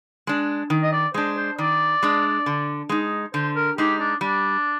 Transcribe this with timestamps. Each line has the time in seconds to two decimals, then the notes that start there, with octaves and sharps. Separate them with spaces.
0.27 G#3 D4
0.70 D#3
0.83 D#5
0.93 D5
1.14 G#3 D4 C5
1.37 C5
1.58 D#3 D5
2.03 G#3 D4
2.46 D3
2.89 G#3 D#4
3.34 D3 C5
3.56 A#4
3.78 G#3 D#4 G4
4.00 D4
4.21 G3 D4